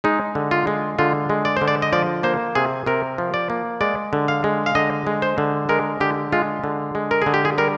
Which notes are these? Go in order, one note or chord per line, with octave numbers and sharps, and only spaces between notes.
G#3 D#4
D3
F4
G#3
D3 F4
G#3
D5
D3 C5
D5
D#5
F3 D5
A#3 C5
C3 G#4
C3 A#4
F3
D5
A#3
G#3 D5
D3
F5
G#3
F5
D3 D#5
G#3
C5
D3
G#3 A#4
D3 G4
G#3 F4
D3
G#3
A#4
D3 G#4
G4
G#4
G3 A#4